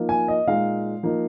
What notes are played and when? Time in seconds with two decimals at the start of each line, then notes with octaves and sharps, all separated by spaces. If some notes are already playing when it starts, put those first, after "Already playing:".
Already playing: F3 A#3 D#4
0.09 G#5
0.28 D#5
0.47 A#2 G#3 D#4 F5
1.03 F3 A#3 D#4